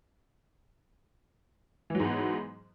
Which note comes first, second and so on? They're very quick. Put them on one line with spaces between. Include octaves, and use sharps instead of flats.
E3 F#3 G#2 B3